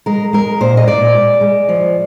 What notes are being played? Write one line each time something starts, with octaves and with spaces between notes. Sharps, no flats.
G#3 A#4
G#3 A#4
A#2 C5
D#5
A#2 D5
G#3
G#3
F3